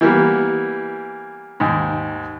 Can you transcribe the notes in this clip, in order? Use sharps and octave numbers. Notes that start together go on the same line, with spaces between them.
E3 G3 A#3 B3
D#2 G#2